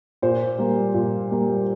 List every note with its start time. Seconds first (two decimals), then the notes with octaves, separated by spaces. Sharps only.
0.22 A#2 C5
0.58 G3 A#3
0.94 A#2
1.31 G3 A#3